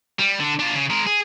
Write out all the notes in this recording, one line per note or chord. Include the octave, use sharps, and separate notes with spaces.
G3
D3 D4
D4 F4
C#3
G#3 A#4
G#4